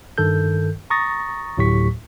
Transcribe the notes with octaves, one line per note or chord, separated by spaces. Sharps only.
G2 D#3 A4 G6
A#5 C#6 D#6 A6 A#6
D2 A2 F#3 G4 C#6 B6